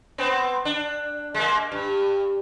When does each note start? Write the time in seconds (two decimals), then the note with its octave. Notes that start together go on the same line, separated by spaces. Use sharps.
0.18 B3 C4
0.65 D4
1.34 G#3 A#3
1.72 G2